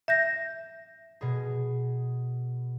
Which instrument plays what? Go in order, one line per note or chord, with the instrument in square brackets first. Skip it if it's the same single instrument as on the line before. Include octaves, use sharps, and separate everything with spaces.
[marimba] E5 G6 A#6
[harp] B2 G#4